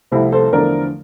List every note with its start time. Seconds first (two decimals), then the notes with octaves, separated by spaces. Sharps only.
0.11 C2 C3 F3 A3 C4 E4
0.32 A4 C5
0.52 E2 D3 F3 A3 A#4 D5